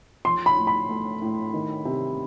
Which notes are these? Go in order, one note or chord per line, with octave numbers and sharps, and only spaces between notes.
F3 C6
B5
A2
B5
A3
A2
D#3
C3